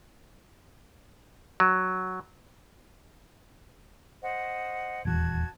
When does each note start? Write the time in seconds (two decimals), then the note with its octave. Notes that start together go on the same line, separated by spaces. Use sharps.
1.60 F#3
4.21 C5 D#5 F#5
5.05 D#1 E2 F#4 A5 G#6